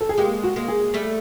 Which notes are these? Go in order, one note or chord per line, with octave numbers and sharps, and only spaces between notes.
A4
G#4
G#3 A#3 G4
F#4
G#3 A#3
G#4
G3 A3